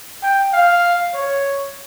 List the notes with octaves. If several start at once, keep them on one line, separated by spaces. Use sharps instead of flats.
G5
F5
C#5